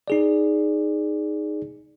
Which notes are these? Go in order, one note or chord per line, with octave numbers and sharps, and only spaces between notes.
D#4 G#4 D5